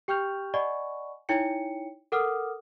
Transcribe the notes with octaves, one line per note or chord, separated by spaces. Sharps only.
G4 G5 C#6 F6 G6 F7
D5 D#5 F#5 G#5 B5 C#6
D#4 E4 C#5 G5 C#7
A4 A#4 F#5 D6 D#6 F6